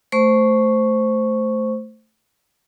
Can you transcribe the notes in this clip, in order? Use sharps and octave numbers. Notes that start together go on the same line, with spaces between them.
A3 C5 C#6